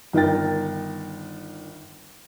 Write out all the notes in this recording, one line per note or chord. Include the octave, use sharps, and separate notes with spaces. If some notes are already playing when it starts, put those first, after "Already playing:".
G1 D#3 A#4 G5 A6